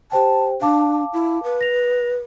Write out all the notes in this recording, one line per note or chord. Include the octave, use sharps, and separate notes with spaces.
G4 C5 G5 A5
D4 F5 A5 D6
E4
B4
A#6 F7